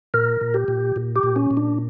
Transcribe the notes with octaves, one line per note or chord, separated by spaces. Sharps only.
A#2 A#4
A#2
G4
A#2
A#2
G4
A#2
C#4
A#2
D4